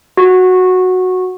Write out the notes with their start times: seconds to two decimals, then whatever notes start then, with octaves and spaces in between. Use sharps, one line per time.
0.17 F#4